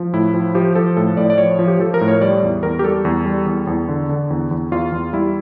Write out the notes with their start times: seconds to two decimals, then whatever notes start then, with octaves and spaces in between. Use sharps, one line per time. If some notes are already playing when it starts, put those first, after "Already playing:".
Already playing: F3
0.13 A2 E4
0.34 F3
0.55 F3 G4
0.75 F3 A4
0.97 A2 A4
1.17 A2 D5
1.30 D5
1.38 F3 C#5
1.59 F3
1.68 G4
1.80 F3 A4
1.94 A#4
2.01 A2
2.08 C#5
2.21 G3 D5
2.43 E2
2.63 E2 A#4
2.79 G4
2.84 G3 A4
3.05 E2
3.26 G3
3.47 E2
3.67 E2
3.89 D3
4.09 D3
4.30 E2
4.51 E2
4.72 E2 F4
4.92 E2
5.13 G3 E4